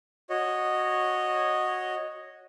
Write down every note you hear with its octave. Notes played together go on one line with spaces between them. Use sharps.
F#4 C#5 D#5